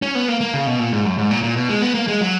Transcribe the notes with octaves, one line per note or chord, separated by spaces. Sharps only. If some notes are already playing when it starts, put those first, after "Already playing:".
C#4
B3
A#3
A#3
C#3
B2
A#2
G#2
F#2
G#2
A#2
A#2
B2
G#3
B3
A#3
G#3
F#3